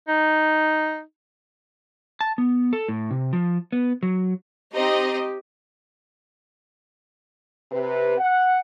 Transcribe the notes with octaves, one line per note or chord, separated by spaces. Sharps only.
D#4
A5
B3
A4
A2
C3
F3
B3
F#3
C4 D#4 G4 D#5
C3 B4
F#5